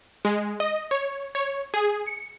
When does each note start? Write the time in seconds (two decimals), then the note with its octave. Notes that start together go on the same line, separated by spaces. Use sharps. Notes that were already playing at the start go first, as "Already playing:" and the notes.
0.25 G#3
0.60 D#5
0.91 C#5
1.35 C#5
1.74 G#4
2.07 C#7